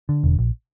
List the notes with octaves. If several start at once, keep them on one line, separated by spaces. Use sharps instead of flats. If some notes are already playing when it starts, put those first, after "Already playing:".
D3
E1
A#1